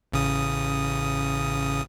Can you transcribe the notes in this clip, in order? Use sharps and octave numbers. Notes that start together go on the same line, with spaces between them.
A1 C#3 D#6